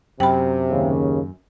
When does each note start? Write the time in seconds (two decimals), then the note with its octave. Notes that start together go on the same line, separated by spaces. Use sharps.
0.20 F#2 C3 G5 B5
0.71 D#2 C#3